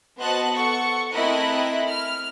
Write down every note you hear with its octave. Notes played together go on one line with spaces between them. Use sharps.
B3 F#4 C5 D#5 A5 F#6
A4 F#5 C#6
A3 C4 E4 A#4 D#5 F#6
F6